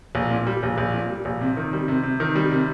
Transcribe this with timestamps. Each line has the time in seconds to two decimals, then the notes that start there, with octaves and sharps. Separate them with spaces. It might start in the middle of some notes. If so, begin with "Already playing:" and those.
0.15 A#1
0.30 A#2
0.47 G3
0.63 A#1
0.78 A#1
0.94 A#2
1.10 G3
1.25 A#1
1.41 C3
1.57 D#3
1.73 G3
1.88 C3
2.03 C3
2.20 D#3
2.35 G3
2.52 C3